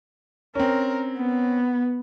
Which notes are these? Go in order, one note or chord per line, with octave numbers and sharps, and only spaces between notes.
C4 C#4 A#4
B3